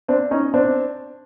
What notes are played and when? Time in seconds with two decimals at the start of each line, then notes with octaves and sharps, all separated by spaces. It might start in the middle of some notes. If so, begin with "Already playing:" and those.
0.08 C4 D4
0.31 C#4 D#4
0.54 C4 D4